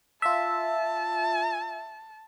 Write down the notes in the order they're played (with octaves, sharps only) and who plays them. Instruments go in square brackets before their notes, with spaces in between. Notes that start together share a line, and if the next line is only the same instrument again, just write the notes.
[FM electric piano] F4 E5 [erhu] A5